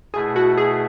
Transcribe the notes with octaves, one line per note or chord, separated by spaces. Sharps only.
B2 A3 E4 G#4
F#4
G#4